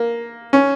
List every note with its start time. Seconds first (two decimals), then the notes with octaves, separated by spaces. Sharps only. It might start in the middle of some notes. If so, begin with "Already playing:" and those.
Already playing: A#3
0.53 C#4